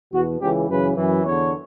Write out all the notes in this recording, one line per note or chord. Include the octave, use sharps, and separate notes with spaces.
E2 B2 F#4
C#2 C#3 E3 G4
F#2 C#3 E3 B4
F#2 E3
E2 D3 C#5